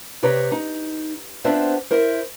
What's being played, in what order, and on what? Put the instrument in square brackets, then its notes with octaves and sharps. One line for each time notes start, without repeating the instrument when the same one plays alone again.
[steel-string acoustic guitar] C3 G4 B4 C#5 A#5
D#4
B3 C4 D4 F4 C5 E5
E4 A#4 C5